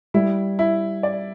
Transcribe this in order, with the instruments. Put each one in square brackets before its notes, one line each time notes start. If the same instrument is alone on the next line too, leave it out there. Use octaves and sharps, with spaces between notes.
[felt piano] G3 [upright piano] E4
[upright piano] E4
D5